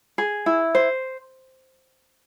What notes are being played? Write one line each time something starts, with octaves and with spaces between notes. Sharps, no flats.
G#4
E4
C5